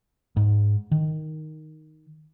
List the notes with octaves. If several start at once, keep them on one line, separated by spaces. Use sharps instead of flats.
G#2
D#3